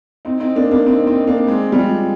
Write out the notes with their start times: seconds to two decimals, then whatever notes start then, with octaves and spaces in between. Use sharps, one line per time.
0.25 C4 D#4
0.40 C4 D#4
0.56 A#3 D4
0.71 A#3 D4
0.86 C4 D#4
1.07 C4 D#4
1.27 A#3 D4
1.47 G#3 C4
1.72 G3
1.78 F3 G#3